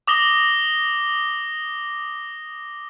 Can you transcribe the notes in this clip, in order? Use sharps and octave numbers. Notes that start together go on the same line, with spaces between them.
D6 D#6 A#6 G7